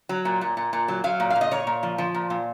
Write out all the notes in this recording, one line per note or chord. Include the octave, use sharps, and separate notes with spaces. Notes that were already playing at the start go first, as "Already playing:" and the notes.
F#3
A#2
A#2
A#2
A#2
F#3
F#3 F5
A#2
F5
A#2
D#5
A#2 C#5
A#2
F3
F3
A#2
A#2